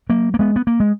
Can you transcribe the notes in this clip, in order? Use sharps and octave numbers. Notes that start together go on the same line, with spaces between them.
F#3 A#3
A#3
G#3 B3
B3
A#3
G#3